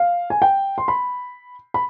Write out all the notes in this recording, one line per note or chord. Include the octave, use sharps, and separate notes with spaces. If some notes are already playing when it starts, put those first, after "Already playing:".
Already playing: F5
G#5
G5
C6
B5
B5